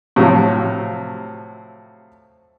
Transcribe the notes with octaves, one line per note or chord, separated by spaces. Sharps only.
A2 C3 F3 F#3